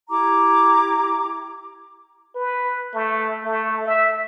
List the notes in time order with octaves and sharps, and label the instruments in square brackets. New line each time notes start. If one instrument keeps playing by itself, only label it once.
[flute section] E4 G4 A#5 D6
[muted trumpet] B4
A3
A3
E5